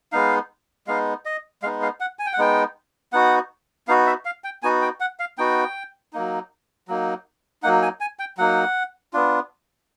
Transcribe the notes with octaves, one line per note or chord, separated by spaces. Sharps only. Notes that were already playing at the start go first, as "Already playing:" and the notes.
G#3 B3 D#4 F5
G#3 B3 D#4 F5
D#5
G#3 B3 D#4 F5
F5
F#5
G#5
G5
F#5
G#3 B3 D#4 G5
B3 D#4 F#4 F#5
B3 D#4 F#4 F5
E5
F5
G5
B3 D#4 F#4 G#5
G5
F#5
F5
B3 D#4 F#4 G5
F#3 A#3 D#4
F#3 A#3 D#4
F#3 A#3 D#4 F#5
G#5
G#5
G5
F#3 A#3 D#4 F#5
B3 D4 F4